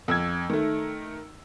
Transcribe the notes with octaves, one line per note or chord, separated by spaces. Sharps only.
F2 E6 G#6
D#3 A3